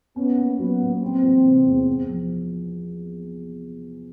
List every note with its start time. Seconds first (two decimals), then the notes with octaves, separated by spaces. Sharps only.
0.16 B3 C#4
0.37 A#3
0.59 F#3 B3
0.81 A#2
1.02 G3 C4
1.23 E3
1.45 C3
1.66 E2
1.87 E2
2.09 F3